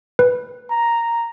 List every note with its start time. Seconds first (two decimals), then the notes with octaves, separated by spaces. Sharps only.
0.19 B4
0.70 A#5